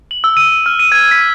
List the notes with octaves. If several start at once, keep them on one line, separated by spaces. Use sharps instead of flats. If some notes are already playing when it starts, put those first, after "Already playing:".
F#7
E6
D#7
F6
D#7
G#6
B6